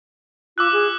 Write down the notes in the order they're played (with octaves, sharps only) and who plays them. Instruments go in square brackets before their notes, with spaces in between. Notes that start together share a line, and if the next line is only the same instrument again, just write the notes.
[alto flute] F4 [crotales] D6 E6 F#6
[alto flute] G#4